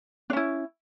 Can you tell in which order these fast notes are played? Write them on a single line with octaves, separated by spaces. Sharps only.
D4 C#4 E4